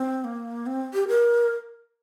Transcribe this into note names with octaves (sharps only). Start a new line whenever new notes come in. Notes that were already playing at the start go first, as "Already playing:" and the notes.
Already playing: C4
A#3
C4
G4
A#4